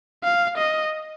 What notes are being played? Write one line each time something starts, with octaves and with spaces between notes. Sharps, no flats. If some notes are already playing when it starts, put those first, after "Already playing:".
F5
D#5